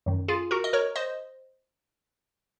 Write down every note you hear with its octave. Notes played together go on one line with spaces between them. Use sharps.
F#2 D#3
F4 G#4
F#4 A#4
D#5
A#4 C#5
C5 D#5